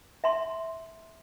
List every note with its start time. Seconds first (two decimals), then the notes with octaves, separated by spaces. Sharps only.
0.24 E5 A#5 C6